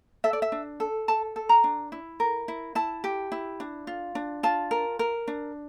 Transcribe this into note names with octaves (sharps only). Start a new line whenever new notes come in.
A4 E5
D5
E5
D4
A4
A4 A5
A4
A#5
D4
E4
A#4
E4
E4 A5
G4
E4
D4
F4
D4
F4 A5
A#4
A#4
D4